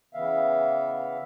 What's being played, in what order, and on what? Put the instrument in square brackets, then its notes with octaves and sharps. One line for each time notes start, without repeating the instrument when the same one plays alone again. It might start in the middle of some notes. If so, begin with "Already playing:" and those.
[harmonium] C#3 E3 B3 E5 F5